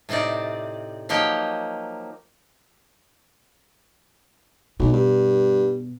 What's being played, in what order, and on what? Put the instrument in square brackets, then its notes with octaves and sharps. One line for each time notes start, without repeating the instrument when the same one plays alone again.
[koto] A2 C3 C4 D#4 D5
F3 F#3 A#3 D#4 G4 G5
[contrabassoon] B1 [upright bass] B2
[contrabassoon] G2